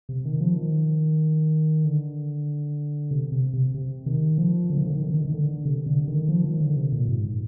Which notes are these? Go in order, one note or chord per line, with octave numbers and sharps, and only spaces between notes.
C3
D#3
F3
D#3
D3
C3
C3
C3
C3
D#3
F3
D3
D#3
D3
D#3
D3
D#3
D3
D#3
D3
C3
D3
D#3
F3
D#3
D3
C3
A#2
G#2